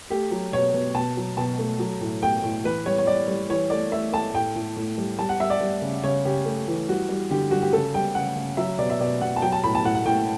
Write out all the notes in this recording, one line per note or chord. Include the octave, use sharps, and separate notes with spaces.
A3 G4
F#3
B2 C#5
B2
B2 A5
F#3
B2 A5
A3
F#3
A2
A3 G5
A2
E3 B4
G3 C#5
C#5
G3 D5
G3
E3 C#5
A3 D5
A3 E5
A3 A5
A2 G5
A2
A2
G3
G3 A5
F#5
G3 E5
D5
G3
C#3
C#3 C#5
C#3 G4
A3
E3
G3 F#4
G3
D3 G4
G3 F#4
G4
C#3 A4
G3 G5
C#3 F#5
C#3
F#3 E5
B2 D5
E5
B2 D5
B2 F#5
A5
F#3 G5
A5
A2 B5
A5
A2 F#5
F#5
A2 G5